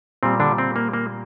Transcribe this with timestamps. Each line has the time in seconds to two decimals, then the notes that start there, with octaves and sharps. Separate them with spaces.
0.23 A#2 G3 C4
0.40 D3 D4
0.58 C4
0.76 A#3
0.93 A#3